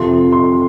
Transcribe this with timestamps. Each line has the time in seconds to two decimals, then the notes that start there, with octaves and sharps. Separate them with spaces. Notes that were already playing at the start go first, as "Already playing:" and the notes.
Already playing: F2 C3 F3 C6
0.32 C6